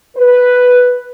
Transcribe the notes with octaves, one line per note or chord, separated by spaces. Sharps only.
B4